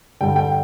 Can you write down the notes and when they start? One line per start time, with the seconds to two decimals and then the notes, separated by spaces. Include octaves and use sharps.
0.21 G2 D3 G3 G5
0.36 G5